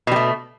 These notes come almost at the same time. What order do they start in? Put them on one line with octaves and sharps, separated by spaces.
B2 G3 A3